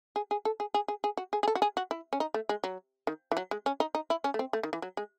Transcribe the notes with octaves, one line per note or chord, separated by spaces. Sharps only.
G#4
G#4
A4
G#4
G#4
G#4
G#4
F#4
G#4
G#4
A4
F#4
G#4
F#4
E4
C#4
D#4
A3
G#3
F#3
D#3
E3
F#3
G#3
C#4
D#4
D#4
E4
C#4
A3
C4
A3
D#3
E3
F#3
G#3